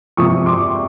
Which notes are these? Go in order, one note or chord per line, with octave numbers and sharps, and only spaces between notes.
C3 F3 G#3 C#6 D#6
C6 D6